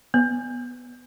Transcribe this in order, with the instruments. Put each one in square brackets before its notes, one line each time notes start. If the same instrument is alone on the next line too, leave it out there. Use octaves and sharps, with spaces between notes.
[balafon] B3